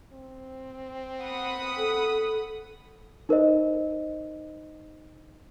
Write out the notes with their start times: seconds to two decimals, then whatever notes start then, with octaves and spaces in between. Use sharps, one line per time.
0.13 C4
1.21 F#5 B5 D#6
1.77 A4
3.29 D#4 A#4 C5 D#5